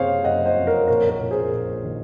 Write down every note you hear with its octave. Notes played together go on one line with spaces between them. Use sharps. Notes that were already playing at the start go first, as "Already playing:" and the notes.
Already playing: F#1 C3 G#4 C5 C#5 F5
F#1 D#5 F#5
C5 D#5
F2
A#4 C#5
A#1 A#4 C#5
A#4 C#5
A#1
G#4 C5
A#1
D#3